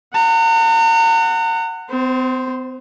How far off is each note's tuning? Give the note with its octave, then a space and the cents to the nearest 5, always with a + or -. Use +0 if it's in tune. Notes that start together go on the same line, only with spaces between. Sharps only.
F#5 +0 A#5 -40
C4 -45 C5 +0